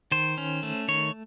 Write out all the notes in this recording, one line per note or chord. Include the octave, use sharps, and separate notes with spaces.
D#3 C5
C#4
A3
D#3 C#5